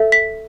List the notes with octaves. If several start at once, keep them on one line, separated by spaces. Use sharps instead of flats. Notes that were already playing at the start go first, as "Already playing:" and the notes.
Already playing: A4 E5
B6